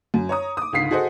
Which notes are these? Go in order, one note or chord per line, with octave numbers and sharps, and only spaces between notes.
F#2
C#5 A#5 D#6
D6 D#6
C#2 G#2 D3 F5 B6 C7
F#4 G#4 A4 C5 D#5 F#5